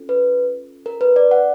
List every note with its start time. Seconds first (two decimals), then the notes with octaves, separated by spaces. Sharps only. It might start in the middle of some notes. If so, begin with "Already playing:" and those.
Already playing: C#4 F4 A4
0.09 B4
0.86 A#4
1.01 B4
1.16 D5
1.31 F#5